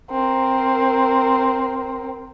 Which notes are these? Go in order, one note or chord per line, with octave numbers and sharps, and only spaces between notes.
C4 A#4